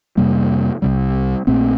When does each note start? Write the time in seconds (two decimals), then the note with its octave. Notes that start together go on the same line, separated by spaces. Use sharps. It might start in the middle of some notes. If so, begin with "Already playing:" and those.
0.17 F2 C3 G3 A#3
0.82 C2 C3 G3
1.47 A#1 A#2 A3 C4